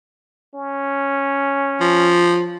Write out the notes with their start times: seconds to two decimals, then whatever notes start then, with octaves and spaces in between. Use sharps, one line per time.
0.54 C#4
1.80 F3